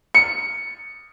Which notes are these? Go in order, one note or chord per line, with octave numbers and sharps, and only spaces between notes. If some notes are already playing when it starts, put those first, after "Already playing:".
C#7